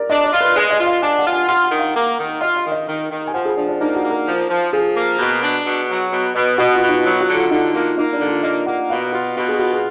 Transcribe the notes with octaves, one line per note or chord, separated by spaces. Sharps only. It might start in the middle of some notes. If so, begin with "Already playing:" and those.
Already playing: A#4 D5
D4 D#5
D5
F4
B4
G#3 D5
D#5
F4
F5
D4 G#5
F#5
F4
G#5
F4 F#5
F#5
D#3
F5
A#3
D#3
F4 D#5
F5
D#3
D#5
D#3
D#3
G#5
F3 F#5
G#4
F3 D4
D4
A#3 D#4
F#4
A#3
A#4
F3
F3
F3 G#4
A#3
B2
D4
B2
F#3
B2
B2
B2 F#4
F4
B2
D#4
F#3 F4
F#4
D3
F4
D3 D#4
A#3 F4
A#3 D#4
D4
D3
F4
A#3 D#5
A#3 F#5
B2 F5
F4 F#4
B2 F#4
G#4
F4 F#4
G#4